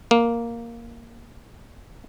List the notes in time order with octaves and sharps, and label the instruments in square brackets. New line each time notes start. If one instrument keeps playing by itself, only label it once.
[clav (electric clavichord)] A#3